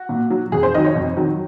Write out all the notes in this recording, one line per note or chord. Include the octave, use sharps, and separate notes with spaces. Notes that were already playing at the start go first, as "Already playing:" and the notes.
Already playing: F#4
A#2
F#3
F2 G#4
C5
D#3 F#3 D#5
C#5
F2
D#3 F#3